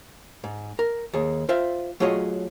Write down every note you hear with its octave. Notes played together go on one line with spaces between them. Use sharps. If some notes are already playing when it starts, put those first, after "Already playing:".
G#2
A#4
D#2 G#4
F4 C5 E5 F5
F#3 A3 F4 G#4 C#5 D#5